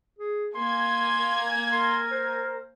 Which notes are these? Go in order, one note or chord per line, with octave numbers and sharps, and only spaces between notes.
G#4
A#3 G#5 C6 G#6
A#4 C6
C5